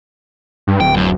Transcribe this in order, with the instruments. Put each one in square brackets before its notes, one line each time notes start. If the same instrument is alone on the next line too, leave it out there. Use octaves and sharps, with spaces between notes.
[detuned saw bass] G2
[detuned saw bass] D1 [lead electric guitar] G5
[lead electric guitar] F#2